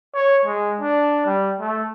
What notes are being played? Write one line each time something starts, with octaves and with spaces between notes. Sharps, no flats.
C#5
G#3
D4
G3
A3